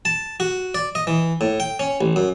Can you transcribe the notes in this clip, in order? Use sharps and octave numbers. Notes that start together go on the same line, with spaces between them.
A5
F#4
D5
D#5
E3
A2
G5
C#4
A1
F#2